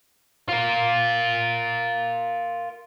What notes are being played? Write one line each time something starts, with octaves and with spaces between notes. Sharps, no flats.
F4 A#4